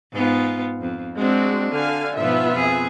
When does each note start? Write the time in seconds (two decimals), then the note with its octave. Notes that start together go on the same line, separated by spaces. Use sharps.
0.13 G#2 B3 F4
0.81 F2
1.18 G#3 C4 D4 F#4
1.73 D3 F5 G#5
2.17 G#2 B2 F3 B3 F4 E5
2.54 F2 G#4